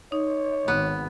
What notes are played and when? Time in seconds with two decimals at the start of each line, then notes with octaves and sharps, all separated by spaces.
0.12 D#4 C#5
0.68 G#1 B3